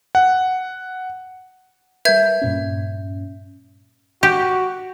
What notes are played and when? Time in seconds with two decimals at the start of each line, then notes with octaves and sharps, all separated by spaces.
0.15 F#5
2.05 G3 A#4 B4 E5 G6 G#6
2.42 G2 A#2 C#4
4.23 F#4 G4